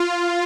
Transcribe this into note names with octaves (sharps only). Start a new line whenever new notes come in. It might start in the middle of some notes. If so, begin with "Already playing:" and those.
Already playing: F4